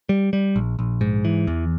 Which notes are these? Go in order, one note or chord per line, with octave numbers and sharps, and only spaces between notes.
G3
G3
A#1
A#1
G#2
E3
E2